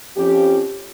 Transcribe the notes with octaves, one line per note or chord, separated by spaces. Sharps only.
F2 F3 C#4 G4